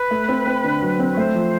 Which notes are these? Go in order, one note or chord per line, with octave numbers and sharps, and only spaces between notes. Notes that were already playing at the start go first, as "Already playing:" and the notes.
Already playing: B4
A3
C4
C4
D3
F#3
C4
C#5
A3 C5
F3